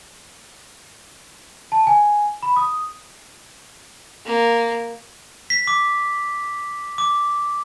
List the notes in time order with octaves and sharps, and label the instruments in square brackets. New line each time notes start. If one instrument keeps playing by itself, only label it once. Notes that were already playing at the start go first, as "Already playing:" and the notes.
[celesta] A5
G#5
B5
D#6
[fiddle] A#3
[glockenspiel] B6
D6
D6